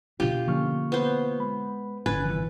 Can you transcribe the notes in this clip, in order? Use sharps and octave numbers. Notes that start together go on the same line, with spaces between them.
B2 D4 F4 G4
D3 F3 A#3 C#4 C#6 F6
B3 C5
G#3 B5
G1 A2 C#4 B4 G#5 G#6 A6
C3 D#3 E3 F#3